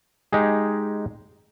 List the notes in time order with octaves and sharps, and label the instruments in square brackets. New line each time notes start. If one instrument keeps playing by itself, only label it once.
[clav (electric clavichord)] G#3 D#4 G4 G#4